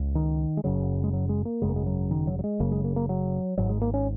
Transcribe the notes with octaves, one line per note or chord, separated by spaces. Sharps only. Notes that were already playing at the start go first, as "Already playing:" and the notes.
Already playing: C#2
D#3
G#3
F#1 F#2 C#3 F#3
G#3
F#3
G#3
A#3
G#1 F#2 C#3 G#3
A#3
G#3
F#3
D#3
F#3
F#3
G#3
F#1 F#2 C#3 A#3
G#3
A#3
A#3
F#3
G#1 G#2 F#3
G#3
A#3
C#4